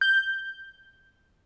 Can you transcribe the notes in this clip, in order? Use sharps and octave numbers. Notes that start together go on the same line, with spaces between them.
G6